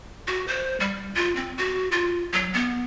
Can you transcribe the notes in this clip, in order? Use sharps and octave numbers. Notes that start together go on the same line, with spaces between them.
F#4
C5
G3
F4
C4
F#4
F4
F#3
B3